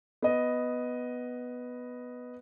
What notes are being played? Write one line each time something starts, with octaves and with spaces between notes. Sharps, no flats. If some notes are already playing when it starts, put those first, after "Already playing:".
B3 D#5